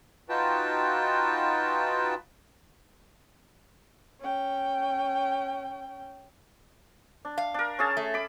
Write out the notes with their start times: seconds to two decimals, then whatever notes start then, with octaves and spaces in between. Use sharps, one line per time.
0.29 D#4 F4 F#4 B4 G5 A5
4.20 C#4 G5
7.25 D4
7.38 F5
7.54 D4 A#4
7.79 C#4 G#4 A5
7.97 A3
8.14 B5 D6